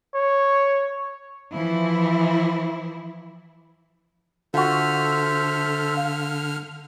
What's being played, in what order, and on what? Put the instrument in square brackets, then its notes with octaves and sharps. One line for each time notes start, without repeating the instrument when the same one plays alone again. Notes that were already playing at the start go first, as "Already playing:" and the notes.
[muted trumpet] C#5
[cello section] E3 F3 E4
[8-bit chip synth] D3 F6 [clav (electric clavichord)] F4 F#4 [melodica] A4 C5 E5
[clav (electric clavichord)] F5